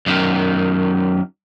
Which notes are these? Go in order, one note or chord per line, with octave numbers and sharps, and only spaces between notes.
F#2 D#3